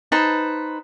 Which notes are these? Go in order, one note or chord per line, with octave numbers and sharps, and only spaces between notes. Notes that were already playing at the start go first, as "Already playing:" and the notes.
D#4 B4 C5 A5